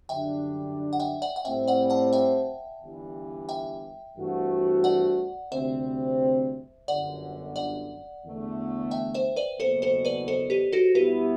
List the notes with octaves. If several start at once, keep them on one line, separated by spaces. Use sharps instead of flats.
F#2 D3 G3 D4 E5 G5
F#5
E5 G5
D5 F#5
F#5
A2 G3 C4 E5 G5
D5 F#5
F#5 A5
E5 G5
G1 G2 E3 G3
E5 G5
G2 E3 A3 C4 F#4
D5 F#5
D2 C3 G3 C4 C5 E5
G1 F#2 D3 D5 F#5
D5 F#5
E2 D3 A3
E5 G5
C5 E5
B4 D5
F#1 E2 B2 A4 C5
A4 C5
B4 D5
A4 C5
G4 B4
F#4 A4
B2 G3 B3 E4 G4 B4